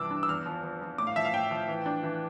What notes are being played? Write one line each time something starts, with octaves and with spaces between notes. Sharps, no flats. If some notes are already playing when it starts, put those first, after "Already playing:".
Already playing: G2 C3 E3 D4 D6 E6
D4
E6
E2 F6
F3
F3
F3
A2 D6
F5
F3 E5
F5
A2 G5
F3
E3
D4
E3